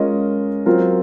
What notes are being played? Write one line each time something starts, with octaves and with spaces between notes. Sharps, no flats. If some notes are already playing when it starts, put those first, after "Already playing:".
Already playing: G#3 C#4 F4 A#4 D#5
F#3 C4 F4 A#4